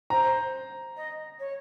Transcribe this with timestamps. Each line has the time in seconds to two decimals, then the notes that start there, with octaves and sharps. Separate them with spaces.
0.10 C5 A#5
0.96 D#5
1.39 C#5